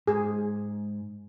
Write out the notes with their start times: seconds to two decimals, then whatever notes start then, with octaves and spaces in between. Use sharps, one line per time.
0.07 G#2 G#4